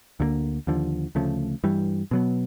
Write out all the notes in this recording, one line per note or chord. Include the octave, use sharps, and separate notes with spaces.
D2 D3 F3 A#3
D#2 D3 F3
D2 C#3 F3 A3
G2 E3 G3
B2 F#3 B3